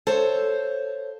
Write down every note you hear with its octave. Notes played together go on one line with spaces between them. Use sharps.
A4 C5 C#5 F5